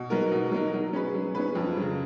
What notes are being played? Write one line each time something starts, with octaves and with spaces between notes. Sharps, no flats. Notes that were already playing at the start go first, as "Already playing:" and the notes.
Already playing: B2
F#3 B3 D#4 A#4
B2
F#3 B3 D#4 A#4
F#3
C#4 G#4 B4
F#3
C#4 G#4 B4
F2
C#3 F#3